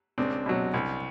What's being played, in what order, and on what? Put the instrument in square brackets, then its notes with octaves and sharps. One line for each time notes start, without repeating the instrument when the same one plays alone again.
[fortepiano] C#2 C4 D4
B2 F#3
C2